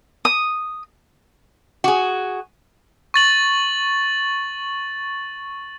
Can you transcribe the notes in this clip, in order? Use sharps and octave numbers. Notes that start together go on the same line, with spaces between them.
D#6
F#4 G#4
C#6 A6 F#7